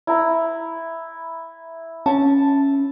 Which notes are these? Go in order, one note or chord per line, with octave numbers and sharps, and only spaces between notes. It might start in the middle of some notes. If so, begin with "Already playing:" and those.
E4 A#5
C#4 A5